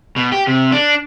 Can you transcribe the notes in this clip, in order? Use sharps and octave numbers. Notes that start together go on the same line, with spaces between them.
B2
G4
C3
D4